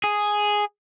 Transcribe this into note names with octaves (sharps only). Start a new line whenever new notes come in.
G#4